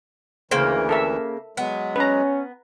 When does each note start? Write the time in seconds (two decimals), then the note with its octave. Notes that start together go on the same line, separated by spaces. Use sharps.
0.51 D2 C#3 E3 A#3 C5
0.89 A4 A#4 E5
1.57 F#3 G#3 B3
1.96 C#4 B4 A#5